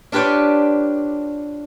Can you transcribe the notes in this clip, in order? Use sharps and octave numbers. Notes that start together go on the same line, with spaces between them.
D4 F4 G4 B4 C#5 D5